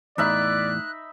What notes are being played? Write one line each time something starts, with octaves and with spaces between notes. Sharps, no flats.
E2 A2 D#4 D5 E5 B5 F#6